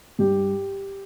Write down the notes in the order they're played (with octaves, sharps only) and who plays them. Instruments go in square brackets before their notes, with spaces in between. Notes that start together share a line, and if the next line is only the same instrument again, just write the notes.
[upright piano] G2 G4